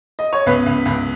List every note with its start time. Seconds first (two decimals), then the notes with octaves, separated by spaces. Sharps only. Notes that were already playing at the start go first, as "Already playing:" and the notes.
0.19 D#5
0.33 C#5
0.46 C#2 B3 B4
0.66 C#2
0.85 C#2